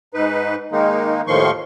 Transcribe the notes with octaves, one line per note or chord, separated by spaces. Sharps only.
G#2 D#4 B4
D#3 G#3 A#3 D#4
D#2 A2 D#3 F3 C6 C#6